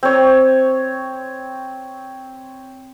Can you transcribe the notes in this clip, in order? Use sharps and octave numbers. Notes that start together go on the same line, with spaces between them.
C4 C#5